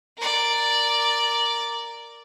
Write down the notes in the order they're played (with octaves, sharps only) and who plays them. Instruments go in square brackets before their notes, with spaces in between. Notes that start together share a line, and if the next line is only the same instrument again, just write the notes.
[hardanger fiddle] A#4 D5